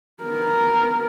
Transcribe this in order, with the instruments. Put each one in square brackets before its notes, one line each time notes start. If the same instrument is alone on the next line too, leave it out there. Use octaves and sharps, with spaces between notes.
[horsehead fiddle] B3 A#4